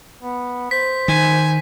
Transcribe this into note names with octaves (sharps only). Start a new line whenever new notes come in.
B3
C5 B6
D#3 G#5